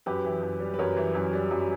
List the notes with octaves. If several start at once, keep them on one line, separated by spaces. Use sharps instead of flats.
F#2 G4 B4
E3
F#2
G3
B4
F#2 A#4 C#5
E3
F#2
G3
F#2